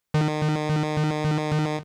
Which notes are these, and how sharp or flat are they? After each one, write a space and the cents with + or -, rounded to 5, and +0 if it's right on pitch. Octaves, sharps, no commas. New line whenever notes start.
D#3 -35